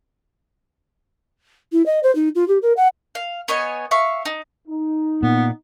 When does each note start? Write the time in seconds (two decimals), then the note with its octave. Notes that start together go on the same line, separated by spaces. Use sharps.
1.72 E4
1.86 D#5
2.03 C5
2.15 D#4
2.35 F4
2.48 G4
2.62 A#4
2.76 F#5
3.15 F5
3.48 B3 C#5 D#5 G#5
3.91 E5 F5 C#6 E6
4.25 D#4
4.67 D#4
5.23 A#2 B3